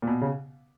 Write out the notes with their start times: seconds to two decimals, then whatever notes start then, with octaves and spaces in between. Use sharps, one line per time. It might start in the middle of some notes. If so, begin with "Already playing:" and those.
0.02 A#2
0.07 B2
0.21 C#3